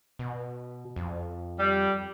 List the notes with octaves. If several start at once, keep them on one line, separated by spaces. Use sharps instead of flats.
B2
F2
G3